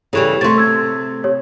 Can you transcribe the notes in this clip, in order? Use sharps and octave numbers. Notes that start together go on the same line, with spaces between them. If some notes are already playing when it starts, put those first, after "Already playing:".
C#3 E3 G3 A4 C#6
C3 A3 C6 C#6 A6
E6 G#6
G4 C#5